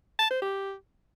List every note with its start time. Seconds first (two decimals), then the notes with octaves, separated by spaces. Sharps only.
0.19 A5
0.31 C5
0.42 G4